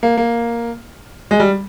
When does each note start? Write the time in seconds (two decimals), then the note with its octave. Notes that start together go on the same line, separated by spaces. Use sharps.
0.03 A#3
0.17 A#3
1.31 G#3
1.40 G3